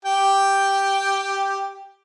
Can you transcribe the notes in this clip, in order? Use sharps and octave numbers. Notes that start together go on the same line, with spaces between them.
G4 G5